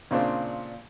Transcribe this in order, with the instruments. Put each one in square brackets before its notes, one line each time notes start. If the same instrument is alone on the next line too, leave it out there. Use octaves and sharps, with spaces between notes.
[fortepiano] A#2 C#3 C4 D4